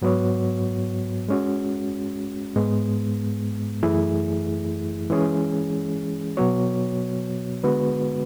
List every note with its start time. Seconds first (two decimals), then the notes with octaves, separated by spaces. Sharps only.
0.02 G#2 F#3 B3 F#4 C#5
1.29 G#3 C#4 F#4
2.56 G#2 G#3 B3
3.83 F#2 E3 A3 E4 G#4
5.10 E3 G#3 C#4 G#4
6.37 B2 F#3 B3 F#4 C#5
7.64 D3 G#3 B3 F#4 B4